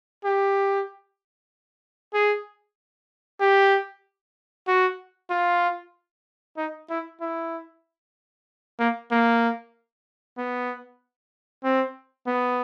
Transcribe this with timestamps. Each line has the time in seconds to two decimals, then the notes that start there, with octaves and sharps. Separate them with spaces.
0.25 G4
2.14 G#4
3.40 G4
4.67 F#4
5.30 F4
6.57 D#4
6.90 E4
7.21 E4
8.79 A#3
9.11 A#3
10.38 B3
11.64 C4
12.27 B3